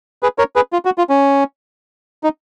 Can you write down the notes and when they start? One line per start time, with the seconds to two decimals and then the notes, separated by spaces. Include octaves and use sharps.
0.23 G#4 B4
0.38 A#4 C#5
0.56 G#4 B4
0.73 F4
0.85 F#4
0.98 F4
1.10 C#4
2.24 D#4